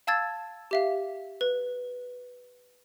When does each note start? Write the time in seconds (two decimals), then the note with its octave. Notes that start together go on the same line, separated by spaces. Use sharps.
0.07 F5 A5 E6 G#6 A6
0.71 G4 E5 F5
1.41 B4